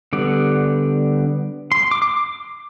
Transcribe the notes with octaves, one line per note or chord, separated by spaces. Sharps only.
D3 G3 B3 D5
C6
D6
D6